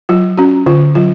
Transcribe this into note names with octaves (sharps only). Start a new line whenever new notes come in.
F#3 F4
C#4 F#4
D3 F4
F#3 F4